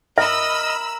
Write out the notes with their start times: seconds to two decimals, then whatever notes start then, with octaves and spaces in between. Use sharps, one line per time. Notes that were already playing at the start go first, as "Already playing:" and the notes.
0.18 A#4 D#5 E5 B5 E6